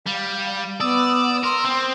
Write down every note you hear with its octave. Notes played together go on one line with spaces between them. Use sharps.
G3 F5
B3 D5 D#6 E6
A#4 C6
C4